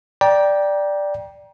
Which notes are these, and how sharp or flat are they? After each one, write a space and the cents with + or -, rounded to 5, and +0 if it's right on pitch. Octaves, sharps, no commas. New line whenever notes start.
D5 +0 G5 +0 A#5 +30